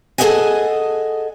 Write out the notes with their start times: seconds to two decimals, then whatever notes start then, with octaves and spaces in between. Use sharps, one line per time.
0.18 G#4 A4 C#5 D#5 F#5 G#5